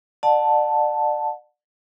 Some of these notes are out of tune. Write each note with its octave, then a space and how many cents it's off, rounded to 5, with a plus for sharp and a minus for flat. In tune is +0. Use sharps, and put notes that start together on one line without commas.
D5 +30 F#5 -30 A5 +0